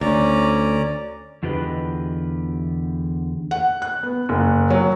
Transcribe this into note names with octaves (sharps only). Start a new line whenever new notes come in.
D2 C#4 D5 A#5
E2 D3 F4 G4 B4 D#5
F#5
F#6
B3
F#1
F#3